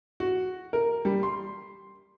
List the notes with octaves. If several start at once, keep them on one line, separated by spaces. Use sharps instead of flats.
F#4
A#4
G3
C6